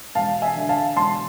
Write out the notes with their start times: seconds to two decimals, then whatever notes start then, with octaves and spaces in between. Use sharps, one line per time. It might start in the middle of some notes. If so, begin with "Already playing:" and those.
0.15 E1 F5 A5
0.42 E5 G#5
0.56 D3
0.69 F5 A5
0.96 E1 A5 C6